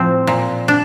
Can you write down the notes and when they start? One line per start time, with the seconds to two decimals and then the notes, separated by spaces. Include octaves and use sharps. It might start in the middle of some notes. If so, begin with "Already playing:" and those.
Already playing: A2 F3 C4
0.27 A#2
0.68 D4